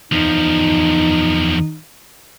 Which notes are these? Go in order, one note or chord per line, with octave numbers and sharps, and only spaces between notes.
E2 F3 D#4